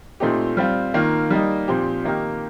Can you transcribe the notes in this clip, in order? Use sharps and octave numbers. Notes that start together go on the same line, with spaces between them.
A#2 A3 C4 D#4 G4
G3 C4 F4
D#3 A#3 F4
G3 A#3 D#4
A#2 F3 C4 G4
D#3 A#3 D#4 G4